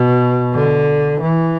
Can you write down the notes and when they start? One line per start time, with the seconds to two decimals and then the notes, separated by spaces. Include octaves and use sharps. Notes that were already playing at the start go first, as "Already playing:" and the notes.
Already playing: B2
0.54 D3
1.21 E3